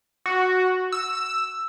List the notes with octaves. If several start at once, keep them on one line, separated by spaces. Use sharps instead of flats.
F#4
E6